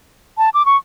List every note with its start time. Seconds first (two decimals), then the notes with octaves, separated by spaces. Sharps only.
0.38 A5
0.54 D6
0.66 C#6